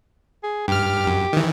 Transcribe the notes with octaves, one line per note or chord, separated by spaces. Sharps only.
G#4
G2 G4 F6
F#2
D#3 E3